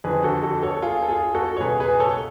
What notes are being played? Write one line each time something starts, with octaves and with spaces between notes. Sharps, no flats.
F2 D3 F3 G#4 B4
F#4 A4
F#4 A4
A4 C#5
A4
F4 G#4
A4
F4 G#4
F#4 A4
C#5
C#2 B2 G#4 B4
G#4 B4
A4 C#5